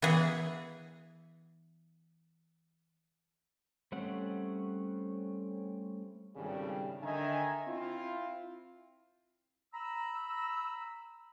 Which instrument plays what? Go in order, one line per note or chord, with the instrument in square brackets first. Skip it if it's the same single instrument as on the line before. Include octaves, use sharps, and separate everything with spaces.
[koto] E3 B3 G#4
[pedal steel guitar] G3 A3 C4 C#4 F#5
[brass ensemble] G#1 A2 C#3 G3
D3 D#3 D#5 E5 G#5 A#5
C4 E4 F4
[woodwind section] A#5 B5 E6